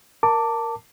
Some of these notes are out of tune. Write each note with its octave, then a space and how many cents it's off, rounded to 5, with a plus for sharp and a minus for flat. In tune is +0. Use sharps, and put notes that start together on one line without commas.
A#4 +0 A5 +20 D6 -5